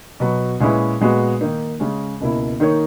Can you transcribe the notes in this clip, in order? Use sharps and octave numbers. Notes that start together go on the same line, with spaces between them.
B2 F#3 B3 F#4
A#2 G#3 C#4 E4 B4
A#2 G#3 B3 F#4
D#3 A#3 D#4
C#3 G#3 C#4
C#2 B2 A#3 E4
D#3 A#3 D#4 A#4 C#5